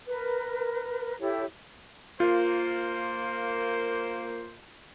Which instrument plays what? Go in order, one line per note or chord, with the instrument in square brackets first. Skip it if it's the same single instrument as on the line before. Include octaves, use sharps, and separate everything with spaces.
[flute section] A#4 B4
E4 G4 A4 C#5
[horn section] A#3 C5 [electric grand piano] F4